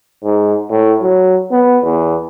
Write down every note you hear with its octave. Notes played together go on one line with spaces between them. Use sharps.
G#2
A2
F#3
B3
E2